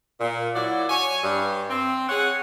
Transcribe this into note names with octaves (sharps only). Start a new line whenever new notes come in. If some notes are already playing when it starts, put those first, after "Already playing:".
A#2
F#3 E4 F#4 D5
C#5 G#5
G2
C4
G#4 C#5 F#5